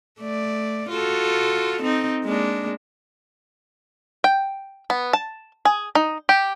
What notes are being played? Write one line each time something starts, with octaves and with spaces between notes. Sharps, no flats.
A3 D5
F4 F#4 A4
C4 D#4
G#3 A#3 D4
G5
B3
A5
G#4
D#4
G4